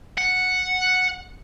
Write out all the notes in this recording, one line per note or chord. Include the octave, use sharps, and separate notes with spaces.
F#5